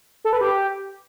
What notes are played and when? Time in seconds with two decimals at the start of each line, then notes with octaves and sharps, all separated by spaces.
0.25 A4
0.33 B4
0.41 G4